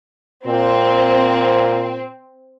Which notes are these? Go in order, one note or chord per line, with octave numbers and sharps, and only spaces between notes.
A#2 C4